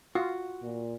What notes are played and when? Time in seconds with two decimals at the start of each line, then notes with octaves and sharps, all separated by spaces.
0.15 F4 F#4
0.63 A#2